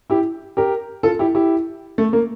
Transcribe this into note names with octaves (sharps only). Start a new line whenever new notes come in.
E4 G4
G4 A#4
F4 A4
E4 G4
E4 G4
A3
A#3